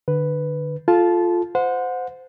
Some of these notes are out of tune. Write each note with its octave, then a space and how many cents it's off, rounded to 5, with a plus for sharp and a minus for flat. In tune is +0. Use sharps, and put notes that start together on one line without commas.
D3 +25 B4 +0
F4 +0 A4 -20 A5 -20
C5 -20 F#5 -30